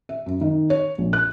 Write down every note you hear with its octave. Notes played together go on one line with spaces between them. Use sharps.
E5
F#2
D#3
C#5
A#1
F#6